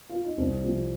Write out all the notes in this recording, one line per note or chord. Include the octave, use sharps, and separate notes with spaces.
F4
D#4
C2 C4
C3 F3